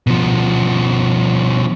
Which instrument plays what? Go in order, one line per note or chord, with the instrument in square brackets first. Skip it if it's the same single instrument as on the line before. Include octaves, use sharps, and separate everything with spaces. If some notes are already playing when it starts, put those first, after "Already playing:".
[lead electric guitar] B2 F3